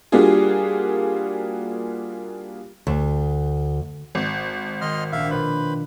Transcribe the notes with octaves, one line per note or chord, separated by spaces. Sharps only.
G3 A#3 D4 F4 F#4 G#4
D2
G#1
D#3 D#5 C6 F6
A#1 D4 E5 F5
B2 F4 B4 C5 B5